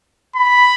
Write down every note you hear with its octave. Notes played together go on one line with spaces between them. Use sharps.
B5